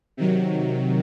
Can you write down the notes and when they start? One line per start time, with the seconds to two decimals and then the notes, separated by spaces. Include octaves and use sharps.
0.17 C3 D#3 F#3